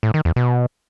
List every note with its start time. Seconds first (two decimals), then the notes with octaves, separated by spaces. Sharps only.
0.03 A2
0.14 D#3
0.25 E2
0.36 B2